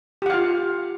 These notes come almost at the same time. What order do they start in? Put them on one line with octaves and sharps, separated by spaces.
G4 F#5 F5 F4